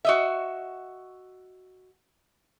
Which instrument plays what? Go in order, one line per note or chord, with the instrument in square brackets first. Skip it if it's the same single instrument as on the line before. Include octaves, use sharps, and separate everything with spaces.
[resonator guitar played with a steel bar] F#4 D#5 E5